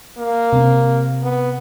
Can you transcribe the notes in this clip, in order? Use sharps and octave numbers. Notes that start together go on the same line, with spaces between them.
A#3
C3 C4
B3